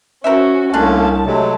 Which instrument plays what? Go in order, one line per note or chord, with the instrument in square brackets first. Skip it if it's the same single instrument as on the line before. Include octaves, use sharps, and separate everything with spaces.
[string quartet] C#4 F#4 [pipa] A#4 C5 E5
[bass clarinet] C2 [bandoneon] A3 A#3 C#4 [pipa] D4 F4 [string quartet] A5
[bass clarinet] C3 [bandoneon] F#3 G#3 A3